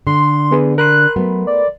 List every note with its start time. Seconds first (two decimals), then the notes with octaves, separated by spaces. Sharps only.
0.07 D3 C6
0.51 B3 G#4 B4
0.78 A#4 B5 C6 F#6
1.16 F#3 A3 B3
1.47 D5